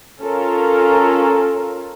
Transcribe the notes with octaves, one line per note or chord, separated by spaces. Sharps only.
C#4 F4 A4 A#4